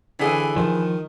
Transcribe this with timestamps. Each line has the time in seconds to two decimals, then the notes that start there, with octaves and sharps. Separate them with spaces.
0.19 D3 E3 G#4
0.56 D#3 F3